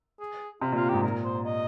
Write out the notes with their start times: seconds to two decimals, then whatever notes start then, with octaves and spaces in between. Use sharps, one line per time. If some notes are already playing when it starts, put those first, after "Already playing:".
0.20 G#4
0.61 C3 F4
0.72 A#2
0.76 F4
0.89 G#2 G4
1.03 A#2 A#4
1.24 C5
1.46 D#5